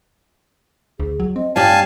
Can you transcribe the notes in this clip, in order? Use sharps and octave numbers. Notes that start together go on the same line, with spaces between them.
D2 G#4
F#3
C4 D#5
G2 G3 G4 C#5 F5 G#5 A5